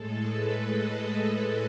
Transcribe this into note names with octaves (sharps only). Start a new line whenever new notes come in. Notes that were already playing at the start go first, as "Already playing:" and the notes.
Already playing: A2 G#3 A4
B4
D#5
D#5